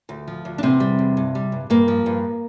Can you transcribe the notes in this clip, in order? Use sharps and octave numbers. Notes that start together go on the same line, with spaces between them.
D2
F3
D2
D4
E2 C3 C4
G3
E2
G2
G3
G2
G2 A#3
F3
G2